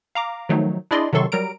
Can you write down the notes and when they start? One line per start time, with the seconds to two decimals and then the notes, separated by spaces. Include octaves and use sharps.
0.15 F5 A#5 D6
0.49 D#3 F3 F#3 A3 D#4
0.91 D4 E4 G#4 D5 D#5 C6
1.13 C3 D#3 F#3 A4 C6 C#6
1.32 F#3 G3 A#4 A#5 D7